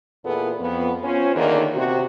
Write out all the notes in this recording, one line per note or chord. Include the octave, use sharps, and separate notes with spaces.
E2 A#2 B3 E4 G#4 A4
F2 B3
C#4 F4 C5
E2 D3 D#3 A#3 D4 D#4
C3 F#4